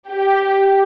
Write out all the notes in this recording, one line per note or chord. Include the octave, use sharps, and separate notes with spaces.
G4